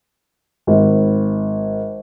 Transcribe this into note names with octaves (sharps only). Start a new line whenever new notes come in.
G#1